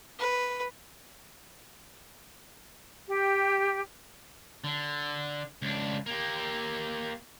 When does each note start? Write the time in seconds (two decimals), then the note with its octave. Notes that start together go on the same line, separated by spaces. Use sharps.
0.19 B4
3.08 G4
4.64 D3
5.62 C#2 D4
6.06 A#3 G4